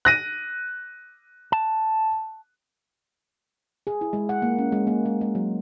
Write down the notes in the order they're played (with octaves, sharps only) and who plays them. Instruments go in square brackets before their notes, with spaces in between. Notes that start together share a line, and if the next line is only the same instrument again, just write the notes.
[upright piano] F#6 A#6 D#7
[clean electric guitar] A5
[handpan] G#4
E4
G#3
F#5
A#3
C#4
G#3
A#3
G#3
G#3
F#3